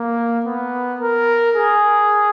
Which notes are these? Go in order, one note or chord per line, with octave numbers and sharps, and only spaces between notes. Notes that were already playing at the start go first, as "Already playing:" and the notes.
Already playing: A#3
B3
A#4
G#4